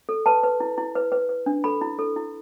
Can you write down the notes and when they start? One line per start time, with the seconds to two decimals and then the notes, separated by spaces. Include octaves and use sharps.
0.09 A4
0.26 B4 A5
0.43 B4
0.60 E4
0.78 E4
0.96 B4
1.12 B4
1.29 B4
1.46 D4
1.64 A4 B5
1.81 E4
1.99 A4
2.16 E4